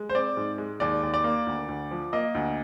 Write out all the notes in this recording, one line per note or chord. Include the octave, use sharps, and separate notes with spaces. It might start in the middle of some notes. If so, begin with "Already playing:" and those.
Already playing: G#3
C5
C4 D5
G#2
G#3
D#2 D5
D#2
D5
A#3
D2
D2
F3
A#3 D#5
D2